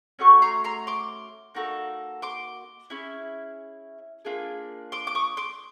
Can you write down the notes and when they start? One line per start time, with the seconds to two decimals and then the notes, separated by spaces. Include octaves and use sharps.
0.19 A3 C#4 F#4 C#6
0.42 A#5 C6
0.64 A#5 C6
0.87 C6 D6
1.55 A#3 D#4 F#4 A4
2.22 C6 D6
2.90 C#4 E4 G#4
4.25 A#3 D4 F4 G#4
4.92 C6 D6
5.07 D6
5.15 C#6 D#6
5.37 C6 D6